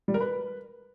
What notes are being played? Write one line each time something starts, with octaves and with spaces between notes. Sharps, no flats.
G3
A#4
B4